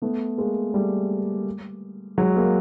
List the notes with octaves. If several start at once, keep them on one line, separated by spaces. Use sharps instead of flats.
A3 B3
G#3 A#3
G3 A3
F#3 G#3
G#3 A#3